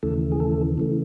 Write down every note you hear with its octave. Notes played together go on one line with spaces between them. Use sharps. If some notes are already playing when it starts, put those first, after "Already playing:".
D#2 C#3 E3 A3 A4
G#4
A3 A4
C#3 E3 A3